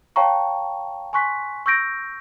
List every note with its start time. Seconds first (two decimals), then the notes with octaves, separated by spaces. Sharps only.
0.16 C#5 F5 G5 A5 A#5 C#6
1.13 G#5 C6 C#6 F#6 B6
1.66 C#6 E6 G6 A#6 D7